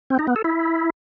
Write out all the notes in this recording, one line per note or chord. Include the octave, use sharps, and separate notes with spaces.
C4
D#4
B3
A4
E4